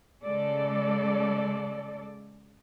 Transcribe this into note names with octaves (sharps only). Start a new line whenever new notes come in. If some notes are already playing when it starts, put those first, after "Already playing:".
C#3 G#3 A4 D5